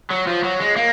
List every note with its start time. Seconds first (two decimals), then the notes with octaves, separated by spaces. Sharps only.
0.10 F#3
0.27 F3
0.43 F#3
0.60 G#3
0.76 A#3